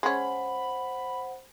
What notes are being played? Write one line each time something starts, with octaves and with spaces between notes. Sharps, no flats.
G#3 C#4 C5 F#5 B5